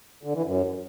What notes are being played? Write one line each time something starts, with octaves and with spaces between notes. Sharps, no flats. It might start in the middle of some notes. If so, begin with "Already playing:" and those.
D3
E3
F#2